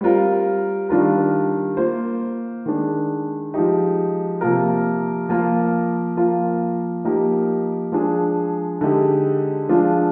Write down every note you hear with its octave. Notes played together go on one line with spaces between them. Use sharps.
G3 C4 F4 A#4
D#3 G3 D4 F4 A#4
A#3 F4 C5
D#3 G#3 D4
F3 G#3 D#4 G4
C3 F3 A#3 F4 A#4
F3 A#3 F4 A#4
F3 A#3 F4 A#4
F3 A#3 D#4 G4 A#4
F3 G#3 D4 G#4
D3 G#3 D#4 G4
F3 G#3 D4 F4